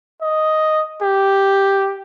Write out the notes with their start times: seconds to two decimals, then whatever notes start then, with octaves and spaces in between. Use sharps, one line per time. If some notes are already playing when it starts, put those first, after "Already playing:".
0.22 D#5
1.02 G4